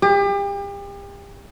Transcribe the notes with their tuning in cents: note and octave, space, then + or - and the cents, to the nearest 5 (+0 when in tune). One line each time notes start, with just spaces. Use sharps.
G4 +35